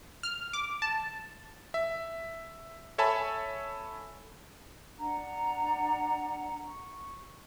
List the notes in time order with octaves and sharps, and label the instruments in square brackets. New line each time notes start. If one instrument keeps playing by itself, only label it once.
[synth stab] F6
D6
A5
[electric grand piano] E5
A4 C#5 E5 G#5 A5 B5
[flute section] D4 F#5 A#5
C#6